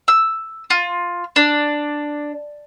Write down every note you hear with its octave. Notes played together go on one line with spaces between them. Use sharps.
E6
F4
D4